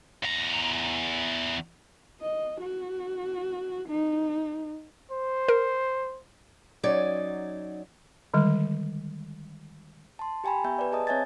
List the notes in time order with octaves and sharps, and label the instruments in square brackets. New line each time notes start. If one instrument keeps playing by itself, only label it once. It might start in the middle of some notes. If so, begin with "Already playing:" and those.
[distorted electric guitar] E2 A#5
[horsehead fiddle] D#5
F#4
D#4
[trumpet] C5
[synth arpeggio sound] A#4
[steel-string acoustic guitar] F#3 C#4 D#4 D5
[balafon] D3 D#3 G3 G#3
[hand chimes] A5 C6
G4 G5 G#5 A#5 B5
B3 G4 E5 G#5 G6
B4 D5
G#4 D#5 A5 A#5 D#6
C4 C#5 E5 G#5 G#6 A6